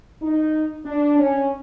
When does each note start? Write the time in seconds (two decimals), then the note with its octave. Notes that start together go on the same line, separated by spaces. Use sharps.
0.22 D#4
0.85 D4
1.19 C#4